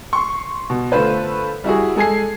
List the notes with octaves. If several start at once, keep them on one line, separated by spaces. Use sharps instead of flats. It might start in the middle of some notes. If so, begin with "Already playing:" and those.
C6 C#6
B2
D3 A3 F4 B4 C5
G3 E4 F#4 G#4
G#3 A4 G#5 G#6 C7